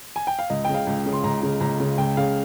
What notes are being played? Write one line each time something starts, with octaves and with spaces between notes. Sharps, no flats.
G#5
G5
F5
C#2 D#5
C#3 G5
F5
C#2
C#3
C6
C#2 A#5
C#3
C#2 A#5
C#3
C#2 G5
C#3 F5